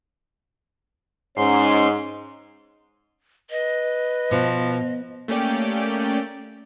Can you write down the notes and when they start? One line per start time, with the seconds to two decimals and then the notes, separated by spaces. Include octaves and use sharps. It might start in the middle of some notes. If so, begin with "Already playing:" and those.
1.37 G#2 C#4 C6
3.50 B4 D#5
4.31 B2 F3
5.28 A3 A#3 C#4 G4 D5 G5